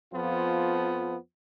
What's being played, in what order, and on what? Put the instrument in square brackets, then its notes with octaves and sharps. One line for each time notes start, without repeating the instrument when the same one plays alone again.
[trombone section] F2 F3 B3 F4